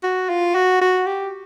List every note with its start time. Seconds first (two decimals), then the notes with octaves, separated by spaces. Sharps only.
0.03 F#4
0.29 F4
0.55 F#4
0.81 F#4
1.07 G4